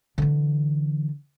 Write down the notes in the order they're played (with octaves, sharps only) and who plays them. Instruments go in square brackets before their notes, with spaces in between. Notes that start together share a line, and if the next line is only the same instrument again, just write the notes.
[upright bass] D3 E3